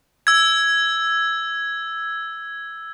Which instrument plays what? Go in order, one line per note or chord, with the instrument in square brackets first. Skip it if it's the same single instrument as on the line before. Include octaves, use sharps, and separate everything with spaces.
[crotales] E6 G#6